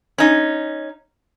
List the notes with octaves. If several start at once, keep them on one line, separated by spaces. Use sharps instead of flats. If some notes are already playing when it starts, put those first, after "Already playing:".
C#4 D#4